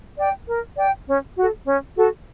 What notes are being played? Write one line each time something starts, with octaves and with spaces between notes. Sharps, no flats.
D5 G5
A#4
D5 G5
C#4
F#4 A4
C#4
F#4 A4